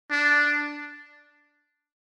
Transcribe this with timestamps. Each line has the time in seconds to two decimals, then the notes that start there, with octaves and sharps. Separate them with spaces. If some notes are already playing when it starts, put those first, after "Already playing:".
0.11 D4